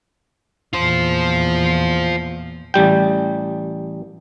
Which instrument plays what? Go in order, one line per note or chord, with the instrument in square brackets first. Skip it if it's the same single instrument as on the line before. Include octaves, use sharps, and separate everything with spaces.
[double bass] E2 A#2 [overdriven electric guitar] F4 C5
[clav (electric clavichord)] A1 G3 G5